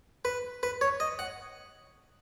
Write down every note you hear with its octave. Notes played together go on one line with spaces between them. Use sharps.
B4
B4
C#5
D#5
F#5